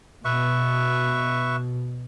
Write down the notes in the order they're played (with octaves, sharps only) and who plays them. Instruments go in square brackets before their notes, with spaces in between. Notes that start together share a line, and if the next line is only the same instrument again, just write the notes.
[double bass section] B2 [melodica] B4 E5 C#6